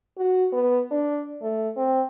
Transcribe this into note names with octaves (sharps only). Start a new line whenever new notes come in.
F#4
B3
D4
A3
C4